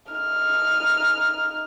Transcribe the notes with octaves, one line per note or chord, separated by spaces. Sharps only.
D#4 F6